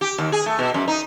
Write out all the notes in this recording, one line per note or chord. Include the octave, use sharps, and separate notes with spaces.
G4
D#2
G#4
A3
B2
F#2
D#4